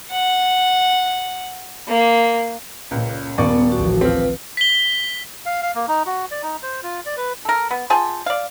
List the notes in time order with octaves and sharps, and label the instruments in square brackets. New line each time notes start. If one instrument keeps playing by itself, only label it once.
[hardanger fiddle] F#5
A#3
[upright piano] C#2 [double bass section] A#2 C#3
[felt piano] D#1 [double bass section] D#3 [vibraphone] B3 [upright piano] D5 C#6
[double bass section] A1 D2 F3 [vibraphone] F#4
[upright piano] C4 F4 [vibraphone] B4
[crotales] B6 G7
[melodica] F5
F5
A#3
D#4
F#4
D5
D#4
C5
F4
D5
B4
[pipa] A4 A#4
B3
F4 G#4 G5 A5
D5 F5